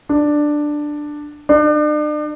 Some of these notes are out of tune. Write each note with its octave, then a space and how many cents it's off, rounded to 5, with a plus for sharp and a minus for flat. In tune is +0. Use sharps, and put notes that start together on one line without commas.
D4 +10
D4 +40